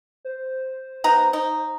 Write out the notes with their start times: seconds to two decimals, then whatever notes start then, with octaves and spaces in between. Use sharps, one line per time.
0.25 C5
1.04 B3 D#4 A#5
1.33 D#4